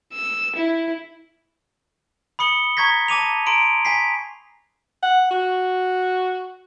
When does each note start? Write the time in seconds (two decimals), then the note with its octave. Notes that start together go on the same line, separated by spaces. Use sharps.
0.13 E6
0.56 E4
2.39 B5 D#6 C#7 G7
2.77 A#5 C#6 G#6 A#6 B6
3.08 A5 D6 D#7 F7
3.46 A#5 C6 D7
3.85 G#5 B6 C7
5.03 F#5
5.30 F#4